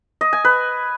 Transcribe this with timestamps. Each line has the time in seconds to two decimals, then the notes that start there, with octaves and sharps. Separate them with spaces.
0.21 D#5
0.33 G#5
0.45 B4